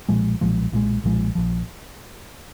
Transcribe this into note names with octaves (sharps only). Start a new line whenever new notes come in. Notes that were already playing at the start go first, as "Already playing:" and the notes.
B1 A#2 F3 G#3
B1 A#2 F3 G#3
B1 A#2 F3 G#3
B1 A#2 F3 G#3
A#1 A#2 F3